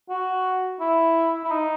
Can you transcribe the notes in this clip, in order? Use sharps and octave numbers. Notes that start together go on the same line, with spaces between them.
F#4
E4
E4
D#4